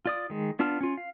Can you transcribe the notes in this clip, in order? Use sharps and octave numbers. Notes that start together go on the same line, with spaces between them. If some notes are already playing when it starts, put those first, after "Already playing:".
F4 D5 D#6
D#3 G#3
B3 D4 F4 A5 F6
C#4 F4
F5